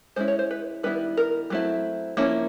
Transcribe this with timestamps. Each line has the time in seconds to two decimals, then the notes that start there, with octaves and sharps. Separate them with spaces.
0.16 G#3 C#4 E4 C5
0.28 C#5
0.39 C5
0.51 B4
0.83 D#3 G3 B3 E4 B4
1.17 A#4
1.50 F#3 A3 C4 E4
2.17 F3 A#3 C#4 E4